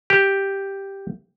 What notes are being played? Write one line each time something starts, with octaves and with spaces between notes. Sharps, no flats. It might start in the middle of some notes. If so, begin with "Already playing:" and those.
G4